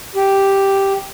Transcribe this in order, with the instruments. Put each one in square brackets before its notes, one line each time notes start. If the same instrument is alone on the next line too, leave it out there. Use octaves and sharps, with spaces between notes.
[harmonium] G4